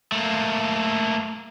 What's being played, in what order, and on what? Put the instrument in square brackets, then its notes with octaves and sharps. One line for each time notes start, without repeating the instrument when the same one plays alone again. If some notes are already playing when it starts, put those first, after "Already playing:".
[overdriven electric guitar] A3 A#3